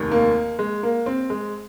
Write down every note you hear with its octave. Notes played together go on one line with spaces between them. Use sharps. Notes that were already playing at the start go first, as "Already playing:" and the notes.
Already playing: F1 D#2 D#3
A#3
G#3
A#3
C4
G#3